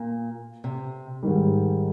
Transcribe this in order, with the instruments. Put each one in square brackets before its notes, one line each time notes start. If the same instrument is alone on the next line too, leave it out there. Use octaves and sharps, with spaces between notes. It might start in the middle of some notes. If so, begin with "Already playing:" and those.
Already playing: [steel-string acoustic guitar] A#2
C3
[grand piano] G#2 D#3 G3